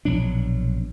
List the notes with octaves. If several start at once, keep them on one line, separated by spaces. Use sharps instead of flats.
A#1 B2 F#3 D4